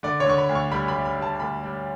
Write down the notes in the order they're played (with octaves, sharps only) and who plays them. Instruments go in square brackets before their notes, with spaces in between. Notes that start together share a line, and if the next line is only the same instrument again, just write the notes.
[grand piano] D3 D5
C#5
D3 C#6
B5
D2
C#6
G3 B5
B5
G3
B5
G3
A5
D2 B5
G3